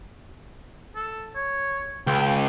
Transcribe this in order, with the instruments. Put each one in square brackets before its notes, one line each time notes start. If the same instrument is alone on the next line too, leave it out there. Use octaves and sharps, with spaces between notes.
[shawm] A4
C#5
[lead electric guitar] C#2 [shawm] G5